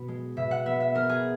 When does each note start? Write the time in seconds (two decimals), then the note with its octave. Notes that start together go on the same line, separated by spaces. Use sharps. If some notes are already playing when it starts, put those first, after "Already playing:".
Already playing: B2 B3
0.08 G#3
0.37 B2 E5
0.51 F#5
0.66 B3 E5
0.80 E5
0.95 B3 A#4
1.09 G#4